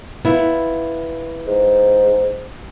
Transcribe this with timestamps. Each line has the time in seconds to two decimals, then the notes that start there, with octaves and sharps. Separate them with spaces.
0.25 B3 E4 F4
1.47 G#2